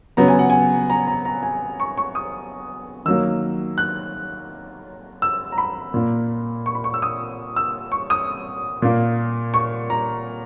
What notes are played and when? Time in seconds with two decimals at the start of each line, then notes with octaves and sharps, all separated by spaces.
0.17 C#3 F#3 B3 A#5
0.28 G#5
0.39 F#5
0.50 G#5
0.90 A#5
1.07 A#5
1.25 A#5
1.43 G#5
1.80 C#6
1.98 C#6
2.15 D#6
3.05 D#3 F#3 A#3 E6
3.78 F#6
5.22 E6
5.52 A#5
5.58 B5
5.94 A#2 A#3
6.66 C#6
6.75 B5
6.84 C#6
6.94 E6
7.02 D#6
7.56 E6
7.92 C#6
8.10 D#6
8.82 A#2 A#3
9.54 C#6
9.90 A#5